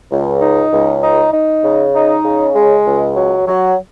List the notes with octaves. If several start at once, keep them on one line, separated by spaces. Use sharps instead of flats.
C#2
D#4
C#2
D#4
D#4
C#3
D#4
C#3
G#3
C#2
F#3
F#3